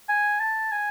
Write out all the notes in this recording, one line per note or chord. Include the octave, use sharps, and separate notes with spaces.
G#5
A5
G#5